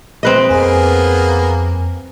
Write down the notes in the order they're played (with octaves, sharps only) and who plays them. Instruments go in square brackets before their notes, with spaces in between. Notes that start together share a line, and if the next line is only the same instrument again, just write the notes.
[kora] C4 B4 D#5
[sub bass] F2 [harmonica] A#3 B3 G#4